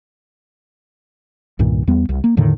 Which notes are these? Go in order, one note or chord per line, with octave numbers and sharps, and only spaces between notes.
C2 G2 A#2 D#3
E2 G3 B3
C2
A#3
E2 A2 D3 D#3